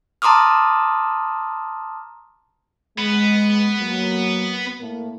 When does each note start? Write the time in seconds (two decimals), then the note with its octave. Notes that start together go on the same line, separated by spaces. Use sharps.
0.22 A5 A#5 C6 D6 D#6 F6
2.98 G#3 B3
3.78 F#3 A#3
4.79 A2 A#3